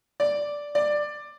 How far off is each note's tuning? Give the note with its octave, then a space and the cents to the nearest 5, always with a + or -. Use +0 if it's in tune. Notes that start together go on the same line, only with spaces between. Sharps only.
D5 -5
D5 +10